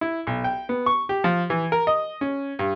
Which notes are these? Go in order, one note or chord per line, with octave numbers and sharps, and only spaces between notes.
E4
B1
G5
B3
C#6
G4
F3
E3
A#4
D#5
C#4
G2